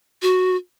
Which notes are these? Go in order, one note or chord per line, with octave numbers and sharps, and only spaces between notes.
F#4